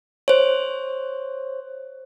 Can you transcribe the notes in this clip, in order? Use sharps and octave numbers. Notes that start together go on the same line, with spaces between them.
C5 C#5